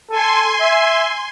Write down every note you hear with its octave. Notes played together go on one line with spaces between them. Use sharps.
A4 G#5 C6
E5